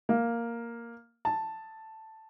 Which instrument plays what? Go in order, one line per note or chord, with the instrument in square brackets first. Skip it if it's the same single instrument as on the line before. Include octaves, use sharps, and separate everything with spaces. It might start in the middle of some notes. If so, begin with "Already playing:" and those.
[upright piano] A#3
A5